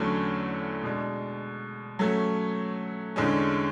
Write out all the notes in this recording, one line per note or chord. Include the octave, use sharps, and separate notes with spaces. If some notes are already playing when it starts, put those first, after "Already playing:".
Already playing: E2 D3 F#3 A3 C#4
B2 G#3 D4
F#3 A3 C#4
E2 D3 G#3 C#4